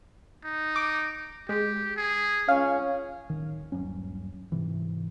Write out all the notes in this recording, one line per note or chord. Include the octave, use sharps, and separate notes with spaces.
D#4
D6
G#3 G4
G#4
C#2 C#4 F5
D1 D#3
D#1 G2 F#3 C#4
G#2 C3 E3